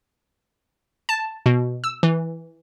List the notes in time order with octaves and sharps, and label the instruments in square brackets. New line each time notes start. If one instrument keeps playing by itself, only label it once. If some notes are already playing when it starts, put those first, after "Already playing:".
[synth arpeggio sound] A5
B2
E6
E3